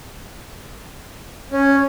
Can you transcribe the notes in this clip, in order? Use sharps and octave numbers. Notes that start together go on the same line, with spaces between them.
C#4